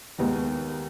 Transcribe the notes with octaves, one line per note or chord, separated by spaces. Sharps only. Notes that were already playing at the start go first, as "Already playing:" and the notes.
D#2 D#3 G#3 B3 D#4